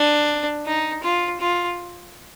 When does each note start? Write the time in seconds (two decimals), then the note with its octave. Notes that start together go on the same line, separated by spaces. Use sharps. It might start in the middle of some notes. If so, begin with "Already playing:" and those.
Already playing: D4
0.66 D#4
1.03 F4
1.40 F4